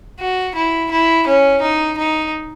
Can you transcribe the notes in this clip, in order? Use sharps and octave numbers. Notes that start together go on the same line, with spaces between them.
F#4
E4
E4
C#4
D#4
D#4